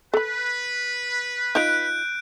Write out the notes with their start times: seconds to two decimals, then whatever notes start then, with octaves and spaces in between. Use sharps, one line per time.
0.14 A4 B4 B5
1.55 D#4 F4 F#6 G6 D7